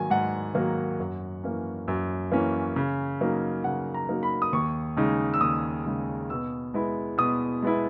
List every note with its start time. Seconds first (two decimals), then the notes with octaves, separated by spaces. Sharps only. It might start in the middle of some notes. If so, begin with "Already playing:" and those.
Already playing: G#2 D#3 F#3 A#3 G#5
0.10 G#2 F#5
0.54 D#3 F#3 A#3
0.99 F#2
1.44 E3 A#3 C#4
1.88 F#2
2.32 E3 A#3 C#4
2.76 C#3
3.21 F#3 A#3 D#4
3.64 C#3 F#5
3.94 A#5
4.09 F#3 A#3 D#4
4.23 B5
4.42 D#6
4.53 D#2 C#6
4.97 C#3 G#3 D#4
5.34 E6
5.41 D#2 D#6
5.86 C#3 G#3 D#4
6.30 B2 E6
6.74 G#3 B3 E4
7.18 B2 D#6
7.62 G#3 B3 E4